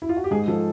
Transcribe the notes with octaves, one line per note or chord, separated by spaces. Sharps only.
E4
F4
F#4
G4
G#2 G#4
F3 A4